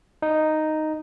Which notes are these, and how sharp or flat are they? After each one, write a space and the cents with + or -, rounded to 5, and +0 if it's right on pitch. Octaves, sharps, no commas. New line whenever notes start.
D#4 -5